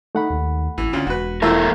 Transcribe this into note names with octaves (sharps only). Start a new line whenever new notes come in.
A3 D#4 F#5 B5
D#2
A1 E3
D2 C#4 F4
E1 F#4 B4
E2 A3 E4 F4 A#4 A5 E6